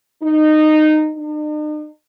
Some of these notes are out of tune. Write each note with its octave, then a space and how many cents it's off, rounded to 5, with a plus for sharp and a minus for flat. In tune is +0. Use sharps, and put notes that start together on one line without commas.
D#4 -15
D#4 -45